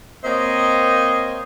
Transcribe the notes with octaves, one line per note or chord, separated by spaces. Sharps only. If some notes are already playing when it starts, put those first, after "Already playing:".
A#3 C4 C5 C#5 D#5